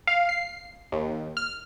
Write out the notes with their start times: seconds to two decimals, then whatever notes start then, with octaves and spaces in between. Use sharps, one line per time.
0.07 F5
0.29 C7
0.92 D#2
1.37 F6